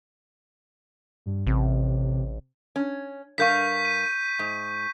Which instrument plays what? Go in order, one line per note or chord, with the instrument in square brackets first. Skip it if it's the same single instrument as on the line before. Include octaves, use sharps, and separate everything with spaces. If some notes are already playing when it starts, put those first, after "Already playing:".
[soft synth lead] G2
[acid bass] A1 [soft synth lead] C3
[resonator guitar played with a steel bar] C#4
[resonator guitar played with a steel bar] G2 A#4 F5 [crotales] C#6 G6 B6
[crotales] D#7
[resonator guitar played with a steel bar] G#2